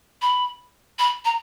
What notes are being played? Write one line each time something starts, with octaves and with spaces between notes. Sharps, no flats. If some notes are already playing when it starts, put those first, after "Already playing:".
B5
B5
A#5